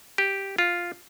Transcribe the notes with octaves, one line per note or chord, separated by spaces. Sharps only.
G4
F4